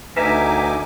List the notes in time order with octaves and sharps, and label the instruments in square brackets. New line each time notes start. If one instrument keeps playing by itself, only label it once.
[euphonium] D2 [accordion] D#4 G#5 D6 [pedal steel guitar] A#4 E5 A#5 [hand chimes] B4